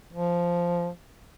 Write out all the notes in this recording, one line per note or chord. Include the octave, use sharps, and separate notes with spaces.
F3